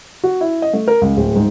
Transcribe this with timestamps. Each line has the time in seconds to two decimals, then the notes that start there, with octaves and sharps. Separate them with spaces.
0.24 F#4
0.41 E4
0.62 D#5
0.73 A3
0.88 A#4
1.01 C#2
1.17 D1
1.35 G#2